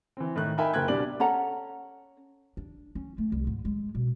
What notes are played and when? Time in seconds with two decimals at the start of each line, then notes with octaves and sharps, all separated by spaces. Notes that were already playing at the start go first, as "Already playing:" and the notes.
0.17 E3 C4
0.36 A2 D#3 F#6
0.58 D#4 A#4 E5 G5 G#5 B5
0.73 F#1 A#4 G5 F#6 G#6
0.88 C2 B2 D4 G4 D5 F#7
1.20 C#4 A4 F#5 A#5
2.57 D4
2.95 C#4
3.18 A3
3.32 C2
3.47 G#2
3.65 G#3
3.95 B2